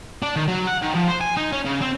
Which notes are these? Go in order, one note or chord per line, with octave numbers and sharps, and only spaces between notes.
D4
D#3
F#3
F#5
D#3
F3
C5
G#5
D#4
C#4
C#3
C4